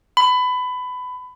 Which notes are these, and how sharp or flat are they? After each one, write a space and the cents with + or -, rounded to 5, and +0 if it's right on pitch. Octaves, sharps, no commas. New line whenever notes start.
B5 +20